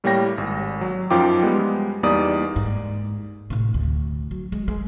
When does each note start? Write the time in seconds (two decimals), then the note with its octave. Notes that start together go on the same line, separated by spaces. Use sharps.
0.04 A2 G3 A#3 C#5 G5 A#6
0.38 G#1
0.81 F#3
1.10 F#2 F3 D#4 F4 G5 D6
1.43 G3 G#3 B3
2.03 E2 G3 A#3 D#4 D5 D#6
2.56 G#2
3.50 A2 C3
3.74 D2
4.31 F#3
4.52 G#3
4.68 G#3